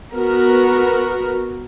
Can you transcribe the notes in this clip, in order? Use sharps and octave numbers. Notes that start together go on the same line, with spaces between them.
B3 F#4 A#4